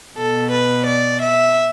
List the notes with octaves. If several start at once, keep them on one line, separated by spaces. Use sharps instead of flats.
B2 A4
B4
D5
E5